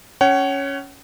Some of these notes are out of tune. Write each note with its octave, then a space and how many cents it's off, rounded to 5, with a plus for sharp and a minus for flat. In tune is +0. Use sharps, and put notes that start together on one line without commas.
C#4 +5 C#5 +0 F#5 +40